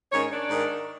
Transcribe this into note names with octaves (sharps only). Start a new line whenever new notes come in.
G#2 D#3 C#4 C#5
D4 D5
G#2 D#3